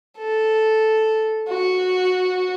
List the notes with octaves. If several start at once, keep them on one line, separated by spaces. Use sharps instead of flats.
A4
F#4